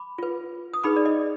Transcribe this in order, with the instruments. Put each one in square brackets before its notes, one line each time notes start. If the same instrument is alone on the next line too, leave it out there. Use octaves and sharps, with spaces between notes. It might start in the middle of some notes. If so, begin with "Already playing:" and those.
Already playing: [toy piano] B5 D6
F4 B4
D#6
D#4 G#4 B4 B5 D6
D5
D#5